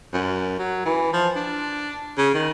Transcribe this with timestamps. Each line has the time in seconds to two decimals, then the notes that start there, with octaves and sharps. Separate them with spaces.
0.13 F#2
0.59 F#3
0.86 E3
1.13 F3
1.36 D4
2.18 C#3
2.34 D#3